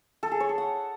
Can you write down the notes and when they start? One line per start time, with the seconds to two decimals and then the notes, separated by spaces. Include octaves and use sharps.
0.23 A4
0.32 G#4
0.40 C#5
0.49 A4
0.58 F#5